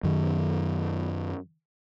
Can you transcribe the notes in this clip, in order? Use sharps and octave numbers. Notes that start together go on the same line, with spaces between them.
F#2 D#3